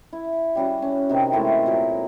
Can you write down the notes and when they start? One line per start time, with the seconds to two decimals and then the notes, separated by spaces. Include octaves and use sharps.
0.13 E4
0.55 G3 C#4 F#4
0.82 C#4
1.09 C3 D#3 C4
1.33 E3 G#3 A3 E4
1.66 A#2 F#3 A#4